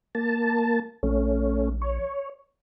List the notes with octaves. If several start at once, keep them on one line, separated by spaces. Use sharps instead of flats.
A#3 A5
A#1 A3 C#4
C#5